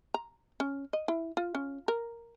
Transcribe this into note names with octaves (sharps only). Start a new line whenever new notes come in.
A#5
C#4
D#5
E4
F4
C#4
A#4